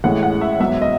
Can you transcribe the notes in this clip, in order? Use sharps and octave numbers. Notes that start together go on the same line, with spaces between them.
A1 A2 G#3 F#5
F#5
E5
G#2 F#3 B3 E5
D#5